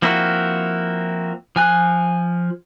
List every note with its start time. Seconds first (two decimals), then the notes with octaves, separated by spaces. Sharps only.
0.02 F3 A#3 C4 E4 F#4
1.56 F3 G#5 F#6